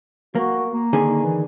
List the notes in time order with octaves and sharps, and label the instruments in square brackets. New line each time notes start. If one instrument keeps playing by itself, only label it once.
[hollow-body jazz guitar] A#3 [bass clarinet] F#4
[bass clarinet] A#3
[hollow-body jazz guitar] D3 D#3 G#4
[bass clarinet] E3